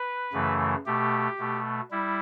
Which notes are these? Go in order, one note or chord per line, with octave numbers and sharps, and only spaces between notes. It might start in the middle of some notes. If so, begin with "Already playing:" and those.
Already playing: B4
F#2 C#3 E3 A3
B2 A3 G4
B2 A3
G3 E4